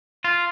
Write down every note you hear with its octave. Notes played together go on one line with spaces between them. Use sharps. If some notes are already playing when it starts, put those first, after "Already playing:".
F4